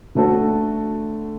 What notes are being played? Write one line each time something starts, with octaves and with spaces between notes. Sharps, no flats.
D3 A3 F#4 A4